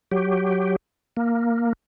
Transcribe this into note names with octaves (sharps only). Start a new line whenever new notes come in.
F#3 G4
A#3